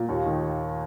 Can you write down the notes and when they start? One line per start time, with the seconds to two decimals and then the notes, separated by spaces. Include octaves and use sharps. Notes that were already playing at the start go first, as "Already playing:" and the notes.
Already playing: A#2
0.09 D#2
0.26 D#3